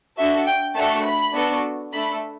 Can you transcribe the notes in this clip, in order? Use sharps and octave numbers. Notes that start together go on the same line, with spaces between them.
D4 F#4 A4 E5
G5
A3 D4 F#4 A4 A5
B5
B3 D4 F#4 A4
A3 D4 A4 B5